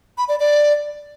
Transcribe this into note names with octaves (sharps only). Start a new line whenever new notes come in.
B5
D5
D5